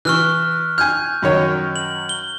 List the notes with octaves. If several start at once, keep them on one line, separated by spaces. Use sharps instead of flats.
E3 C#6 F6 F#6
G#5 F6 G6
F#2 D#3 C#5
F#7
G7